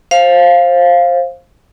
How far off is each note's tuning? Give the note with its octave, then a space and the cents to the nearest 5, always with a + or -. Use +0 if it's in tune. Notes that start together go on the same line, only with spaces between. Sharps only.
C5 +20 F5 +0